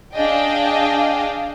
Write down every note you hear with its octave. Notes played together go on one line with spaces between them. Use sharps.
D4 G#4 D#5 F5 G5